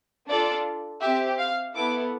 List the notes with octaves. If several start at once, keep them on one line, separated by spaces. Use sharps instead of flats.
D4 F4 A4 D5
C4 G4 E5
F5
B3 E4 A4 D6